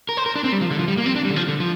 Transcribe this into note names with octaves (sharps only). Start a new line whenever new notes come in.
A#4
C5
A#4
D4
C4
G3
F3
D3
F3
G3
A#3
C4
D4
G3
D3
F3
D3
F3